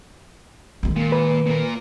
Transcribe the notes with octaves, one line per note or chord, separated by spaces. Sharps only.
D#3 G#3
A#2 A#3
B4
A#2 A#4